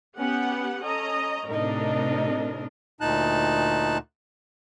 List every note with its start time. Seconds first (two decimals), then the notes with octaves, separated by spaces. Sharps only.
0.17 B3 C#4 G4 F#5
0.83 C#4 A4 D#5 A#5
1.49 A2 C3 D4 D#4 A#4 D#5
3.01 D2 A#2 D#4 A5 F#6